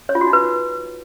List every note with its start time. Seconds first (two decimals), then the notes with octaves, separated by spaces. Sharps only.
0.09 C#5
0.15 F4
0.21 F#4
0.27 D#4
0.33 B4